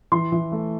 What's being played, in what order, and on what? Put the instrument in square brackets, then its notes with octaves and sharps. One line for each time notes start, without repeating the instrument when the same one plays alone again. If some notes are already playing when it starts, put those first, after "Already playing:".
[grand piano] E3 C6
E3
A3